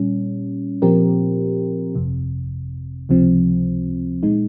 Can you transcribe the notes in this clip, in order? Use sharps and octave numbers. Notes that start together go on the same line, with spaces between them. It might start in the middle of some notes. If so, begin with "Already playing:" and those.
Already playing: A#2 G3 C#4
A#2 F3 C4 G4 A#4
G1 F2 C3
C#2 C3 F3 C4
A#2 G#3 D#4